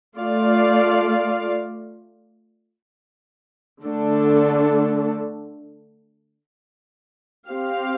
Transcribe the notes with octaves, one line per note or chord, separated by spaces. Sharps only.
A3 F4 D5 F5
D3 A3 D4 A4
C4 G4 F5